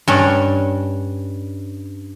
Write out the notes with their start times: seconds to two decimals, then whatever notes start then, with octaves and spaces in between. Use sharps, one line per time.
0.08 G2 C#4 D4